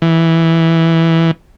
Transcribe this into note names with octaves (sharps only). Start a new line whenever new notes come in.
E3